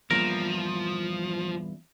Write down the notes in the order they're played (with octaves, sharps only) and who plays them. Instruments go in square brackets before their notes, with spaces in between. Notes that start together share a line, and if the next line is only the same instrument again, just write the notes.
[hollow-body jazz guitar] E2 G2 A#2 [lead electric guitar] F3 [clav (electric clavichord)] A#4